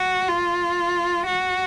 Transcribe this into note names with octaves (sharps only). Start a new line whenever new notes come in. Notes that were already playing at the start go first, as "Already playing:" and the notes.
Already playing: F#4
F4
F#4